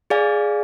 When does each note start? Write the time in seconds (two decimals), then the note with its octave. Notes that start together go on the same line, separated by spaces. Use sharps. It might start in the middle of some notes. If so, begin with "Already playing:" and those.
0.10 G#4 D5 F5 G#5